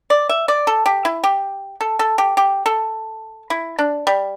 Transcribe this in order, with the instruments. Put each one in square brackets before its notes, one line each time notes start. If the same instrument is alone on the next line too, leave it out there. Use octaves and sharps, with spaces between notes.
[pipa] D5
E5
D5
A4
G4
E4
G4
A4
A4
G4
G4
A4
E4
D4
G3